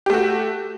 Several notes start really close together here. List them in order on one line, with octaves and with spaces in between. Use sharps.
G4 A3 F#4